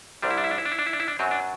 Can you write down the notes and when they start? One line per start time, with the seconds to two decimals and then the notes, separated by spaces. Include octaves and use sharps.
0.22 C2 C3 G3 D4
0.31 E4
0.38 D4
0.44 E4
0.51 D4
0.58 E4
0.65 D4
0.72 E4
0.79 D4
0.86 E4
0.93 D4
1.00 E4
1.08 D4
1.19 F#2 F#3 C4
1.31 D4